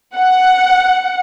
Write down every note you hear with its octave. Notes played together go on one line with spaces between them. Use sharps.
F#5